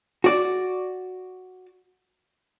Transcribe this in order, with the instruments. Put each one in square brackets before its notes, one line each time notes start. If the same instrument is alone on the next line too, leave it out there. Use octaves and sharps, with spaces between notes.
[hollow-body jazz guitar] F#4 D5